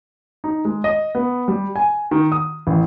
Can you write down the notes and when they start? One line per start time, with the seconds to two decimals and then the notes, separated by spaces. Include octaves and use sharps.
0.44 D#4
0.65 G#3
0.84 D#5
1.15 B3
1.48 G3
1.76 G#5
2.11 D#3
2.32 D#6
2.67 A1